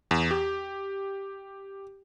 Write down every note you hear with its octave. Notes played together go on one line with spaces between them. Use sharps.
E2
G4